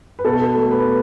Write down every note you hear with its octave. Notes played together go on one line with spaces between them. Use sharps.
B4
B2 A4
A3
B4